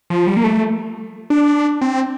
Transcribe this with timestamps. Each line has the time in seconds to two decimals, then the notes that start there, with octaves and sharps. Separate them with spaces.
0.10 F3
0.27 G3
0.37 A#3
0.44 A3
1.30 D4
1.81 C4